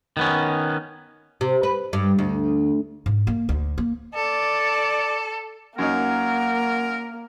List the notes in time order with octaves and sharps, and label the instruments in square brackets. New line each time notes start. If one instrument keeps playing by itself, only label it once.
[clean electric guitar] D#3 B3 C#4
[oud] C3
B4
G2
D2
[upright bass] G#2
A#3
D2
A#3
[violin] A4 [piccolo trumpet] D5
[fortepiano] F#2 C#4 D#4 [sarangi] A#3 [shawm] A#4 [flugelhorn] F#5